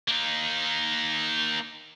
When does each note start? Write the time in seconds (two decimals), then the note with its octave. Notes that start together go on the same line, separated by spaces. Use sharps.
0.08 A#3 D#4